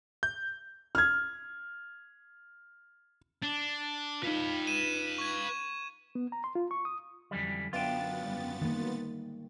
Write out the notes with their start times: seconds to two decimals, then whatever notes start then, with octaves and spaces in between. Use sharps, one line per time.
0.23 G6
0.95 F6 G#6
3.42 D4 A6
4.23 D#4 F4 B4 F5
4.67 D#7 E7
5.18 C#6 G#6
6.15 B3
6.32 A#5
6.44 C6
6.55 F4
6.71 C#6
6.85 D#6
7.31 F2 D3 E3 F#3 G3 C#4
7.73 F#2 B3 D4 F4 E5 F5 G5 A6
8.21 G#1 G3
8.62 D#3 A#3